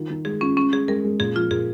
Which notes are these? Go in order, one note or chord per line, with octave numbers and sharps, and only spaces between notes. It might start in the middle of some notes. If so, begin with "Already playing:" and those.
Already playing: D#3 F4
D#3
G#3 G#4
C#4 F4
G#3 C#4
G#3 G#4
G#3 A#4
G#3
A#2 G#4
F3 F4
A#2 G#4